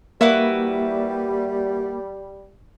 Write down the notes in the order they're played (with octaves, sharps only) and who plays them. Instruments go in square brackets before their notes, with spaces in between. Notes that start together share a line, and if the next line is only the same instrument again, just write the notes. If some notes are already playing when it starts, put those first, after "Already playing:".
[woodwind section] G3 [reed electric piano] A#3 A#4 [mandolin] E4 F#4 B4